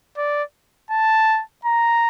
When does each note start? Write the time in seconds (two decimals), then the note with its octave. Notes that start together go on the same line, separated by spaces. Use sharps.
0.17 D5
0.91 A5
1.65 A#5